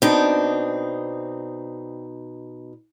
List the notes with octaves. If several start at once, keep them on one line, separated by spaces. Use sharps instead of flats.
B2 C4 D4 D#4